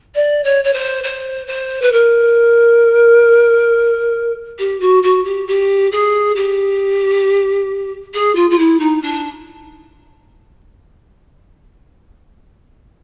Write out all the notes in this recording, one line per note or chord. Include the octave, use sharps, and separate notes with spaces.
D5
C#5
C#5
C5
C5
C5
B4
A#4
G4
F#4
F#4
G4
G4
G#4
G4
G#4
F4
F4
E4
D#4
D4